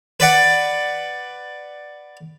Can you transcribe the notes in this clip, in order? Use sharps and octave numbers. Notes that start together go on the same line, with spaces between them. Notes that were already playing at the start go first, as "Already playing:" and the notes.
B4 D5 F#5